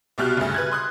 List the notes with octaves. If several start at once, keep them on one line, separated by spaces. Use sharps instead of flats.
C2 B2 G4 F6 F#6
D2 G2 C#3
B4 F#6 G#6
C6 D#6 F#6